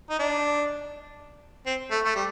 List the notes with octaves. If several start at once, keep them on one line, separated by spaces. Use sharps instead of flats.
D#4
D4
C4
A3
A3
G3